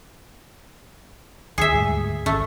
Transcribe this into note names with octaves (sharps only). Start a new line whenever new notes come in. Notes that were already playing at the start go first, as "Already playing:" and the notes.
D#2 G#4 E5
D2 G#2 G3
A1 D#2 A3 C#4